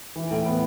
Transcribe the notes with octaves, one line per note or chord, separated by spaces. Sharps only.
E3
A2
B3